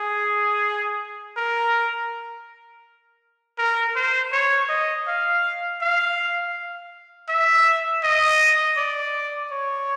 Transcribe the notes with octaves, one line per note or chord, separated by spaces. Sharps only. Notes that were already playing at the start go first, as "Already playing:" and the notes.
Already playing: G#4
A#4
A#4
C5
C#5
D#5
F5
F5
E5
D#5
D5
C#5